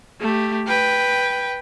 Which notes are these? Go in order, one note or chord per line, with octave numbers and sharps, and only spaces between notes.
A3 G4
B4 G5